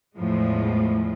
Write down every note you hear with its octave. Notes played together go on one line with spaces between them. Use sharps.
E2 A2 F3 G#3